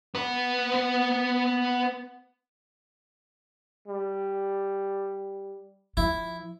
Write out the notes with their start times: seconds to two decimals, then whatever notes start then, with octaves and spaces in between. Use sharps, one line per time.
0.15 B3 B4
3.88 G3
5.97 F3 E4